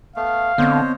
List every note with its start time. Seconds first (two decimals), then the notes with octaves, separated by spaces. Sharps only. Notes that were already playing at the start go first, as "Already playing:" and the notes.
0.16 A3 B3 F5
0.58 D3 B3 C4 C5 C#5 D#5